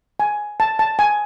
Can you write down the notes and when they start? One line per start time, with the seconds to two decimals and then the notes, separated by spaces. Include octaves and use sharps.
0.20 G#5
0.60 A5
0.79 A5
0.99 G#5